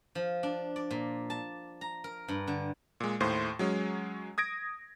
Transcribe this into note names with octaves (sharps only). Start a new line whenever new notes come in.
F3
D4
D5
A#2
A5
A#5
A#4
G2
D3
A#2 G#3
D#2 A2 C5 C6
F#3 G#3 C#4
D#6 G#6 A#6 D7